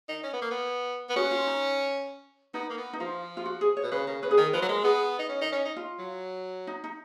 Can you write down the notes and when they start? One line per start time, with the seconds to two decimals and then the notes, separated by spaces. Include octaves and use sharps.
0.09 D#4
0.23 C#4
0.33 B3
0.42 A#3
0.51 B3
1.09 B3
1.16 C#4 F#4
1.31 F4
1.47 D#4
2.54 B3 D#4
2.70 A#3
2.78 B3
2.93 D#4
3.00 F3 F4
3.37 F4
3.46 F#4
3.61 G#4
3.77 C#5
3.83 B2
3.92 C#3 B4
4.07 C#3 A#4
4.22 C#3 B4
4.31 G#4
4.37 D#3 A#4
4.53 F3 B4
4.62 F#3
4.69 G#3 A#4
4.83 B3 G#4
5.19 D#4
5.29 C#4
5.41 D#4
5.52 C#4
5.65 D#4
5.76 F4
5.99 F#3
6.67 D#4
6.84 D#4